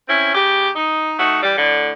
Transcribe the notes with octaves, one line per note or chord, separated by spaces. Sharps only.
C4 C#4 E4
C#3 G4
D#4
A3 D#4 F#4
E3 G3
A2 D3